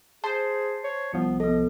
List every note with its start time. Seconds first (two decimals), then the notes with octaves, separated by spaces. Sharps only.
0.24 G#4 C5 A5 C7
0.84 C#5
1.13 C2 F3 B3
1.40 B3 A4 D#5